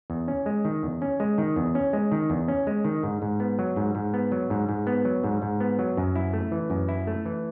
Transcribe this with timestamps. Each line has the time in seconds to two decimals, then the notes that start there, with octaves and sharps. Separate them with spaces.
0.10 E2
0.28 C#4
0.46 G#3
0.65 D#3
0.83 E2
1.02 C#4
1.20 G#3
1.38 D#3
1.56 E2
1.75 C#4
1.93 G#3
2.12 D#3
2.30 E2
2.48 C#4
2.67 G#3
2.84 D#3
3.03 G#2
3.22 G#2
3.40 B3
3.59 F#3
3.76 G#2
3.95 G#2
4.14 B3
4.32 F#3
4.50 G#2
4.69 G#2
4.87 B3
5.05 F#3
5.24 G#2
5.42 G#2
5.60 B3
5.79 F#3
5.97 F#2
6.16 E4
6.33 A3
6.52 E3
6.70 F#2
6.88 E4
7.07 A3
7.26 E3